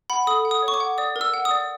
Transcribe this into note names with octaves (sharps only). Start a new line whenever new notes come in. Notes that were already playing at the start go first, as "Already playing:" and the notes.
F#5 B5
A4 D#6
F#5
D#6
C#5
C#6
D6
F#5
D5 D#6
A#4
E6
F#5
D#6
D5